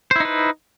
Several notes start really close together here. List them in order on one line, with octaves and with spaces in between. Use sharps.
C5 E4 D#4 B4